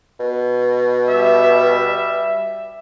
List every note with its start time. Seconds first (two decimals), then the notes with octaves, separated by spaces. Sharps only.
0.20 B2
1.08 G3 E5